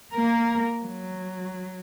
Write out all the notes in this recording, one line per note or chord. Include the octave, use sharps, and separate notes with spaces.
A#3 A#4
F#3